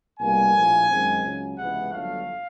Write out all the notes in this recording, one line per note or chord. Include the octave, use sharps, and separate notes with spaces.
C2 B2 G3 A#3 G#5
A#1 A2 F3
F#2 D#3 G#3 C4
C#2 C#3 F#3
C#2 C3 E3 G#3 B3 F#5
G1 F2 D3 F#3 A3 F5